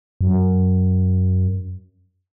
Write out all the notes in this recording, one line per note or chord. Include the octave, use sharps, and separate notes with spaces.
F#2